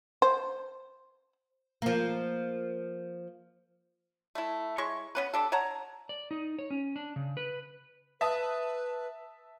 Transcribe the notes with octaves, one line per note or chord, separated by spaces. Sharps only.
C5
F3 A#3
A3 E4
G#3 E4 C#5 C#6
B3 C#4 B4
G3 D4 A4
C#5 F#5 A5 A#5
D5
D#4
C#5
C#4
D4
C#3
B4
B4 E5 A5 D#6